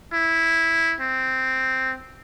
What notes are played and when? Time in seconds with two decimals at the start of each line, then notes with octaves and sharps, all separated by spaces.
0.13 E4
1.00 C4